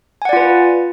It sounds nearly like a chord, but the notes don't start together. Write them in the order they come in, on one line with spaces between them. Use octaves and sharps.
G#5 F#5 D5 F4 B4